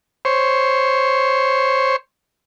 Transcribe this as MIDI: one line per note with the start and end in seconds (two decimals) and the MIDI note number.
0.25 1.96 72
0.25 1.96 73